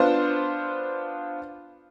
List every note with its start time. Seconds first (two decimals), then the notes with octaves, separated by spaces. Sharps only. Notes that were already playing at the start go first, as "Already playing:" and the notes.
Already playing: B3 D4 F4 C5